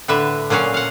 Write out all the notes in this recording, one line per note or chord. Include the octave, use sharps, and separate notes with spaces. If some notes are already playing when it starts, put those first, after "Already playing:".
A2 D3 B4 E5
A#2 F#3 C#4 F#4 F5
F5 F#5